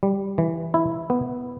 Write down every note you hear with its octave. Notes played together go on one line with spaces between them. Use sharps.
G3
E3
E4
B3